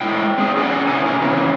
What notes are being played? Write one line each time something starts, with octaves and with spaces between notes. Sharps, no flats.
G#3 A3 E4 G5
C4 G#4
C#4 G#4 A#4 B4 D5 F#5
C3 B3 C#4 E4 G#5
B2 A#4
C#3 E3 C4